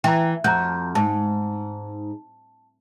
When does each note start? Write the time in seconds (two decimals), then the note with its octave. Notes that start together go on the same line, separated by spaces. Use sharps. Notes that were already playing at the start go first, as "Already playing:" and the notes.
0.04 E3 G5 A#5
0.44 F2 F#4 A#5 G6
0.95 G#2 A5